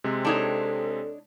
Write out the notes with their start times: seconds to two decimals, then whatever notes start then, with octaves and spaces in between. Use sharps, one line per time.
0.04 C3 G#3 C4
0.25 D4 D#4 A4 C#5